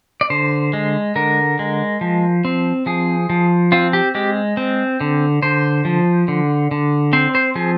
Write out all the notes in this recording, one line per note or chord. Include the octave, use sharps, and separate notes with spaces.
D5
D3 C5
G#3
D3 A#4
G#3
F3
C4
F3 G#4
F3
C4 F4
G4
G#3 G4
C4
D3
D3 C5
F3
D3
D3
C4 C5
C5
F3 G#4